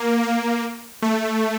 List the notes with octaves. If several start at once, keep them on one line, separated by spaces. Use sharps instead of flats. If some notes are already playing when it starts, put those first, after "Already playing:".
Already playing: A#3
A#3
A3